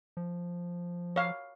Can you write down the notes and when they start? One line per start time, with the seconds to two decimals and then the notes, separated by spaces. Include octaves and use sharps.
0.17 F3
1.16 C#5 F5